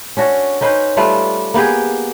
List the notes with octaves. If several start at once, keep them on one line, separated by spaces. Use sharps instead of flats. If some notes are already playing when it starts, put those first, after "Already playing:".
C#4 D4 F#4
C#4 D#4 B4 C5
G3 A3 F4 B4
A#3 B3 G4 G#4